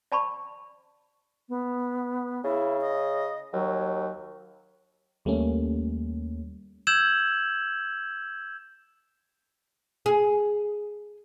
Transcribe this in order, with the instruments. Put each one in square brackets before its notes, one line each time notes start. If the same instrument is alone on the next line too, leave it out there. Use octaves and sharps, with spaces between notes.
[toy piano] D5 A5 B5 C#6
[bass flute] B3
[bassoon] C#3 [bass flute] E4
[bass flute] D#5
[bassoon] D#2 [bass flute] F#3
[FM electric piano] D#2 G3 A3 A#3 C#4
[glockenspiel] E6 G6 G#6 E7 F#7
[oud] G#4